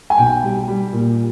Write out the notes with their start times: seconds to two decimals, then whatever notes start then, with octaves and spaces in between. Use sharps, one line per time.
0.10 G#5
0.18 B1 G5
0.43 G3
0.68 G3
0.93 A#2